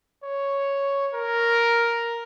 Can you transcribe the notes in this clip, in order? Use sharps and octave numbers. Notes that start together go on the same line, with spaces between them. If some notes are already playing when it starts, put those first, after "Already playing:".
C#5
A#4